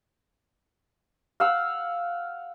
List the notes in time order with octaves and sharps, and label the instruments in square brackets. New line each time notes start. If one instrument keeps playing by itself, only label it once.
[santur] F5 F#5 E6